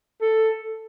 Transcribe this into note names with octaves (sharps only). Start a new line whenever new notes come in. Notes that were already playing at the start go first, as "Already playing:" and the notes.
A4